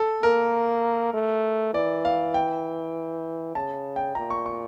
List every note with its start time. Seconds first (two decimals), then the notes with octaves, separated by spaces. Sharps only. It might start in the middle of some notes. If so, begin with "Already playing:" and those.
Already playing: A4
0.23 A#3 A#4
1.14 A3
1.74 E3 D5
2.05 F5
2.34 G5
3.55 C#3 A5
3.96 G5
4.15 A#2 A#5
4.30 C#6
4.46 C#6